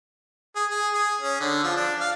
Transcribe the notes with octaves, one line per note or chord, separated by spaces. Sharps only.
G#4
G#4
G#4
C#4
D3
F3
D4
F5